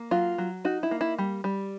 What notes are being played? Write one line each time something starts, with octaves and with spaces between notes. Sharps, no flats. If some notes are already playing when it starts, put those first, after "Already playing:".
Already playing: A#3
F#3 F4
F#3
D#4 F#4
E4
A#3
E4
G3
G3